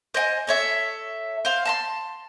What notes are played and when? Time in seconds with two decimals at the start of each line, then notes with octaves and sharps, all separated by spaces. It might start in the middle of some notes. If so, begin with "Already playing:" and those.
0.14 C5 D#5 G5 G#5
0.47 A4 C#5 E5
1.45 C5 F5
1.65 A5 A#5 C6